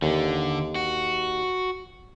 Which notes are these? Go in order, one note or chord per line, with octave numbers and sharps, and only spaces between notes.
D#2 D3
F#4